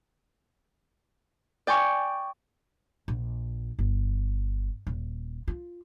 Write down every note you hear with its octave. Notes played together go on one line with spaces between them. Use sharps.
D5 G5 G#5 C#6
A#1
G1
D#1
F4